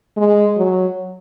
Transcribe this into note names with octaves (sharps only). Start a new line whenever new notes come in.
G#3
F#3